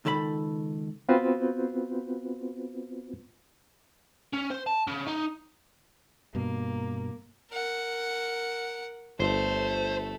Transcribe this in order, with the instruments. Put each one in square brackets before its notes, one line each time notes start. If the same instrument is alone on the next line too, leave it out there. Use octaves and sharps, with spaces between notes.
[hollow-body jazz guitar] C#2 D#3 A4 C#5 B5
[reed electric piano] B3 C4 F4 F#4 B4 C5
[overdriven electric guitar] C#4
C5
A5
C#3
D#4
[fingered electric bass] G2 B2 [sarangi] A#3
[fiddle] A#4 F#5
[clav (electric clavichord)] G1 [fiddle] A3 [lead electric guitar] C5